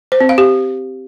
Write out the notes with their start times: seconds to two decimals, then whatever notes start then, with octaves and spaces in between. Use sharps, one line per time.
0.12 C5
0.20 C4
0.29 F5
0.38 G4